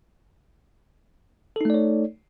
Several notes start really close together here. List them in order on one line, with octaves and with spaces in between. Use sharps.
A4 D#4 A3 D5 C#5